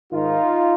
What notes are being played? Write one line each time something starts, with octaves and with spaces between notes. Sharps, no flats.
G#2 D#3 D#4 F4